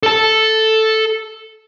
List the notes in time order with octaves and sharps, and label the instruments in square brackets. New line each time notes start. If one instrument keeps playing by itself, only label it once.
[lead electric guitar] A4 A5